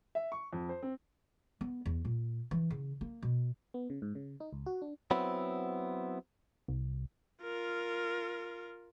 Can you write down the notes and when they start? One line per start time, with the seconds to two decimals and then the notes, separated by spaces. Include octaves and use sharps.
0.15 E5
0.32 C#6
0.53 F2
0.69 C5
0.83 C4
1.61 B3
1.86 E2
2.05 A#2
2.51 E3
2.70 C#3
3.01 A#3
3.22 B2
3.74 B3
3.90 C#3
4.02 G#2
4.15 C#3
4.40 D#4
4.53 C#2
4.66 F#4
4.82 D4
5.11 F#3 B3 C4 E4
6.68 C2
7.43 F4 A#4